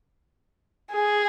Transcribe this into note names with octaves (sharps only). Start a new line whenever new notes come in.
G#4